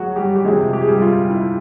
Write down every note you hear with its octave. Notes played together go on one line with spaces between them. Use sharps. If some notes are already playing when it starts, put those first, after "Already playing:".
Already playing: F#3 G#3 F#4 G#4
G3 G4
G4
F2 C3 F3 G#3 G#4
G4
G#4
G3 G4
F4
E4